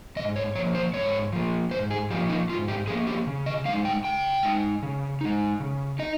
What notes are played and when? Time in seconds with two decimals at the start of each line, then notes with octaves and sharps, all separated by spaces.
0.16 G#2 D#5
0.36 C#5
0.55 F3 C#5
0.58 A#3
0.75 C5
0.93 G#2 C#5
1.33 F3 A#3
1.71 G#2 C5
1.91 G#4
2.10 F3 G4
2.14 A#3
2.29 D#4
2.49 G#2 F4
2.68 G4
2.87 F3 A#3 G#4
3.07 G4
3.27 C#3
3.46 D#5
3.65 G#3 F5
3.69 D#4
3.85 G5
4.04 C#3 G5
4.43 G#3 D#4
4.83 C#3
5.21 G#3 D#4
5.60 C#3
5.99 D#4 D#5